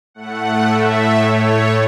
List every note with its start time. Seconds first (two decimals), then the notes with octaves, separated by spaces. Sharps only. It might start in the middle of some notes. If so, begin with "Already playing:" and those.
0.14 A2 A3 F#5
0.65 E5
1.17 C#5